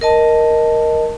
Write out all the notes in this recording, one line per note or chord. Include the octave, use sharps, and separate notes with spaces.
A#4 D#5 A5